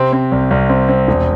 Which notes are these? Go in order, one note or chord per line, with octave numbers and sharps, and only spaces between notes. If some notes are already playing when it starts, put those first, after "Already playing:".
Already playing: C3 C4
C4
C2
C2
C4
C4
E1